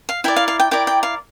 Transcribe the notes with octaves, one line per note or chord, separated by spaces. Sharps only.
F5
E4 A#4 D5 G5
F5
F5
G5
E4 A#4 D5 G5
G5
F5